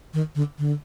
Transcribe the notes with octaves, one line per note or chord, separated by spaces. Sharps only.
D#3
D3
D3